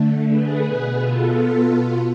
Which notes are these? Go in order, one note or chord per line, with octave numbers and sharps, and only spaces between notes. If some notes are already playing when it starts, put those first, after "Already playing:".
Already playing: D3 A3
G#4 B4
B2 B3
F4 A4
F4